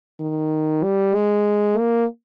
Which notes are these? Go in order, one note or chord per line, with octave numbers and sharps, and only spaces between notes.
D#3
G3
G#3
A#3